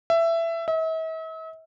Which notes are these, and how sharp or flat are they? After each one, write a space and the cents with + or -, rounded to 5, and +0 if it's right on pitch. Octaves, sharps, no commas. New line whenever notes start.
E5 +15
E5 -45